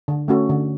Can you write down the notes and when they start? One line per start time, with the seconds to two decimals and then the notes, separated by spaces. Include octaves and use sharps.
0.08 D3
0.28 A3 C#4 F#4 A4
0.49 D3